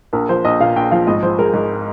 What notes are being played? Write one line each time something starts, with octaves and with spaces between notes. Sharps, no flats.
A#1 A#4
F3 C5
A#1 D#5
A#2 F5
A#1 G5
F3 F5
G#1 D#5
F3 C5
G#3 A#4
G#2